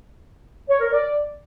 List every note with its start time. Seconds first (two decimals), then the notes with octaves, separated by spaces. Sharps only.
0.69 C#5
0.80 A#4
0.92 D5